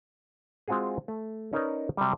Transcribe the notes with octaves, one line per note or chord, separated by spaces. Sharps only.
G#3 C4 F4 F#4 G#4
A3
C#4 D#4 A#4 B4 C#5 D5
C3 F#3 G3